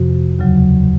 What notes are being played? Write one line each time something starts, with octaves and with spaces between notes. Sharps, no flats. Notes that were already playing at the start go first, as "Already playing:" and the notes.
Already playing: F2 C3 F3 F#4
D#2 C#3 F#3